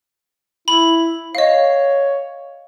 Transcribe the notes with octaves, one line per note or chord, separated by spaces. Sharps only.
E4 B5
C#5 D#5 F5